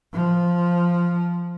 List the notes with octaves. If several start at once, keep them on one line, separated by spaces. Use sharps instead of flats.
F3